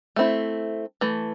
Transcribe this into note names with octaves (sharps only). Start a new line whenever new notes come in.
A3 C4 E4
E3 A3